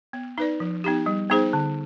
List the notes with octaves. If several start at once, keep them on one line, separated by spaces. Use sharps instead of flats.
B3
D#4 B4 D5
F3
B3 D#4 G4
G3
B3 D#4 G#4 C5
D3